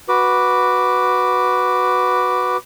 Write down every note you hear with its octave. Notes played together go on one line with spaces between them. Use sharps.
F#4 B4 D6